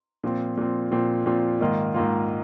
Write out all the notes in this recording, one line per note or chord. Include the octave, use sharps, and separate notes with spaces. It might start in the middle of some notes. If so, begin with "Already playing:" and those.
A#2 F3 C4
A#2 F3 C4
A#2 F3 C4
A#2 F3 C4
G#2 D#3 A#3 F4
G#2 D#3 A#3 F4